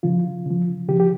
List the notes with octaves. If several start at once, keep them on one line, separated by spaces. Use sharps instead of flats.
C#3 F3 F4
C#3
F3
C#3 F3 G4
G4